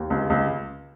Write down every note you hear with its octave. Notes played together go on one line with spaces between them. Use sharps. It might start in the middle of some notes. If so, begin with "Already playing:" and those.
Already playing: D#2
C#2
C#2